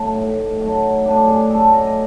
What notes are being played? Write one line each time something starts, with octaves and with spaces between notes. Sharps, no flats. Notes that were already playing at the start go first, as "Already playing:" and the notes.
Already playing: F#3 A3 D#4
A2
F#3 A3
A2 D4
G#4
F#3 A3 A4
D#5